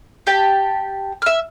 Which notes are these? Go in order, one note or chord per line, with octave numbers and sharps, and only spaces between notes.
G4 G5 A5
E5 F6